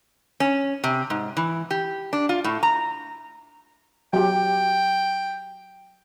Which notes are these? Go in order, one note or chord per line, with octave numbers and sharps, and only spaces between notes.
C#4
C3
G#2
E3
G4
D4
F4
A2
A#5
F#3 G4 G5